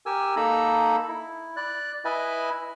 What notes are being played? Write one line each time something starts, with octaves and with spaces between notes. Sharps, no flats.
G4 A#4 G#5 E6
A#3 D#4 A4 A#5 B5 E6
E4
D5 F#6
E4 B4 D#5 E5 G#5 B5